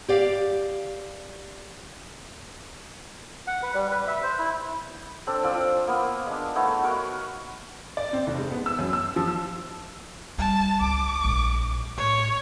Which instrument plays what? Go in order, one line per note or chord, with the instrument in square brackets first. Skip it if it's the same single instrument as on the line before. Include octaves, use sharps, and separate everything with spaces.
[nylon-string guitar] G4 D5 F5
[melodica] F#5
B4
G3
B4
E5
C5
E4
[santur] C4 D4 A4
F3 C4 F4 D5
A#3 B3 D#6
G#3 D4
A3 B3 D#4 C#5
F#4 A#4 B4 C#6
[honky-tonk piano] D5
C4
F1
G#3
B3
E6
F#2
E6
F3
E6
[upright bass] G3 [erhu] A5
[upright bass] C#2 C#3 [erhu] D6
[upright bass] A#1 G#3
[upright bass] A2 [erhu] C#5